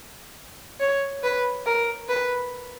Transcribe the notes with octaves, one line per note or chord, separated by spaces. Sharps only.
C#5
B4
A#4
B4